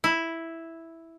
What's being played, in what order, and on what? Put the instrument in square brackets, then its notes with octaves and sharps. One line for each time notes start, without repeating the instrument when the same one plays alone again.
[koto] E4